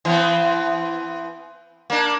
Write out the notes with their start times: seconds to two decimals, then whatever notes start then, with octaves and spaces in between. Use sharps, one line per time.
0.05 E3 B3 C4
1.90 A#3 D4